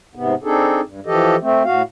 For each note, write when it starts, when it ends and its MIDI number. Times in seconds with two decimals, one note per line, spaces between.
0.15 0.34 44
0.15 0.34 48
0.15 0.34 59
0.44 0.81 60
0.44 0.81 62
0.44 0.81 63
0.44 0.81 68
0.44 0.81 69
0.84 1.00 43
1.06 1.36 52
1.06 1.36 53
1.06 1.36 67
1.06 1.36 69
1.06 1.36 75
1.42 1.63 57
1.42 1.63 60
1.65 1.82 45
1.65 1.82 66
1.65 1.82 77